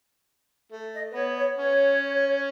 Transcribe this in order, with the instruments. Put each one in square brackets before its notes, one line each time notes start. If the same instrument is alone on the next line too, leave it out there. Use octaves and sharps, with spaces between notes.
[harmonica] A3
[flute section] D#5
B4
[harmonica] B3 [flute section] C#5
[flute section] C#5
[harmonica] C#4 [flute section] C#5